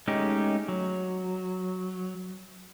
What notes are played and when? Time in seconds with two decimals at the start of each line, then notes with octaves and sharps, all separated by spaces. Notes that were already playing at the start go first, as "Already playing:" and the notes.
0.08 G#3 A3 C#4 D#4 G4
0.69 F#3